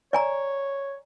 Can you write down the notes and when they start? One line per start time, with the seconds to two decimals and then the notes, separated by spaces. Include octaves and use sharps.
0.13 C#5 D5 G#5 A#5